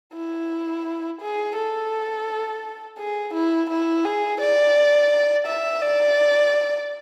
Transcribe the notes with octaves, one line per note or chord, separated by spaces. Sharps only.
E4
G#4
A4
G#4
E4
E4
G#4
D5
E5
D5